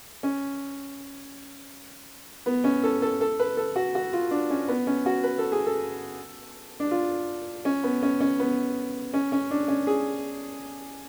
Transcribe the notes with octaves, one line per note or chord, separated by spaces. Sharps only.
C#4
B3
C#4
A4
A4
A4
B4
A4
F#4
F#4
F4
D4
C#4
B3
C#4
F#4
B4
A4
G#4
A4
D4
F4
C#4
B3
C#4
C#4
B3
C#4
C#4
D4
C#4
G#4